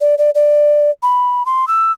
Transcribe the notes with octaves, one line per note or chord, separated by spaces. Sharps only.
D5
D5
D5
B5
C6
E6